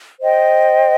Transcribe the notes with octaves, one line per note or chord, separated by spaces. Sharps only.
C5 D#5 G5